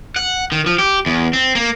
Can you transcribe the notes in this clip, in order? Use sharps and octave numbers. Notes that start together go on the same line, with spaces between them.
F#5
D#3
F3
G4
E2
C4
A#3